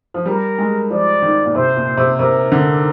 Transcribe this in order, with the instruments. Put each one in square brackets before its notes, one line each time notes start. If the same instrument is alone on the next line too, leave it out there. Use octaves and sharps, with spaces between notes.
[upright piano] F3
[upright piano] G3 [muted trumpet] A#4
[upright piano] G#3
[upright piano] F3 [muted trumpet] D5
[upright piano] D#3
A#2
[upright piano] C3 [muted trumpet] C5
[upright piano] A#2
C3
[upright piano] C3 [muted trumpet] A#4
[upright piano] D3